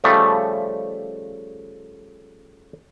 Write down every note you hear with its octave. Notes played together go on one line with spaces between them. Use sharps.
C#3 F3 G3 A3